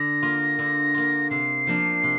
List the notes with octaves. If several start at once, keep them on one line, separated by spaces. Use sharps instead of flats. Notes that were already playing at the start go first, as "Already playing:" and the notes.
Already playing: D3 A#6
A#3 F4
D3
A#3 F4
C3 C7
F3 A#3 D4
C3